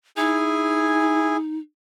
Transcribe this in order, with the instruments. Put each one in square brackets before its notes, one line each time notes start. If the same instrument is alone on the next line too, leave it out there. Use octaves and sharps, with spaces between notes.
[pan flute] D#4 [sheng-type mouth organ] E4 G#4 G#5